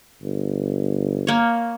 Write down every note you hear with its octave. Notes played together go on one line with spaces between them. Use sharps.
G1
A#3 C#5